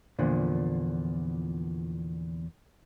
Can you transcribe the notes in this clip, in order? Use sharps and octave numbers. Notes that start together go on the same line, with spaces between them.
E2 A#2 D3 F3